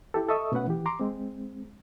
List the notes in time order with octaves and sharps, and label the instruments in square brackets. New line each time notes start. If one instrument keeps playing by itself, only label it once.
[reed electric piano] E4 G4 A4
A4 D#5 E5 C#6 D#6 E6
B2 A3 C#4 B4 F#5
E3 G4
A#5 C6 D6
G#3 C4